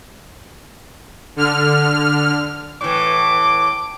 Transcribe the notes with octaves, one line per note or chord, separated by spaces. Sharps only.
D3 F6
A2 E3 D6